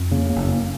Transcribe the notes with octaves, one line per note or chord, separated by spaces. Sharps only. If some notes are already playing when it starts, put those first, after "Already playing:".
Already playing: F2
C#3 A#3
A#3
F#1
A#3